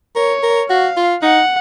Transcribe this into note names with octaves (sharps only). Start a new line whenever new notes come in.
A#4 C#5
A#4
F#4 F5
F4
D#4 F#5